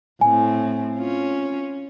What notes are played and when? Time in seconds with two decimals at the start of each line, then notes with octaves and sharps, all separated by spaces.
0.21 A2 C4 G#5
0.96 C#4 F4